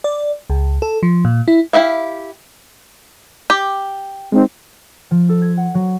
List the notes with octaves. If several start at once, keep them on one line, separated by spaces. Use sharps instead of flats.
D5
C#2
A4
F3
A#2
E4
E4 G4 E5 F5
G4
G#3 C4 D#4
F3
A4
G#6
F#5
F#3